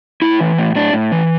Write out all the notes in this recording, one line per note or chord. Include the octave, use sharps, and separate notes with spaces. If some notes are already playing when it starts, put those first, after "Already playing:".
A2 E4
E3
A2
A2 D4
A2
E3